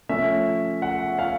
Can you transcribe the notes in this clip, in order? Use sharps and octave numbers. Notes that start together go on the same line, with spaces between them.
F3 A3 C#4 E5
F#5
F5